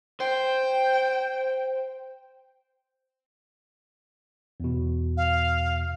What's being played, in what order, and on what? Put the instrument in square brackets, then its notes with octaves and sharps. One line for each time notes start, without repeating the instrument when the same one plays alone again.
[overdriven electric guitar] C5 [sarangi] G5
[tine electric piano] E2 B2
[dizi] F5